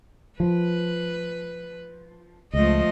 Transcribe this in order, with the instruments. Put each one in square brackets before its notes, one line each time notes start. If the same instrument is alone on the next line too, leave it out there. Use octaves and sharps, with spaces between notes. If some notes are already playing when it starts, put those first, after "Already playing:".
[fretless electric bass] F3 [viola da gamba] B4
[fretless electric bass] C#2 [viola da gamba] F3 A3 D#5